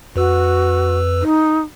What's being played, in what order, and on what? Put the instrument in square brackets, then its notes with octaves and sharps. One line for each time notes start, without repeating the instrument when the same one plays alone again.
[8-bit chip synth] F2 B4 E6 [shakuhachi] F#4
[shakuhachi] D#4